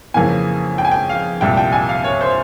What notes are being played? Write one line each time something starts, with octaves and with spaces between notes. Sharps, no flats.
F2 C#3 E3 A#3 G#5
G5
G#5
G5
F5
C2 A#2 G3 G5
G5
G#5
F5
C#5
C5